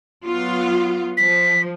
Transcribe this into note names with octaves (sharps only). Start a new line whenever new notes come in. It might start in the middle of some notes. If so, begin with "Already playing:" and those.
F#3 B3 F4
F3 B6